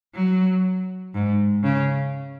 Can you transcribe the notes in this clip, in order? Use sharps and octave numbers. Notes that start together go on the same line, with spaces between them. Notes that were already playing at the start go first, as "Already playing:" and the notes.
F#3
G#2
C#3